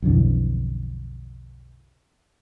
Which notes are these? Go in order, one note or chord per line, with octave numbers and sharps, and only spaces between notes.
B1 F2 D3 E3